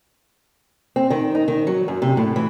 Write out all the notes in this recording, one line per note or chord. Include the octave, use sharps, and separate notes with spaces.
C4
D#3
D#4
D#3
F#3
F#2
C3
A2
E3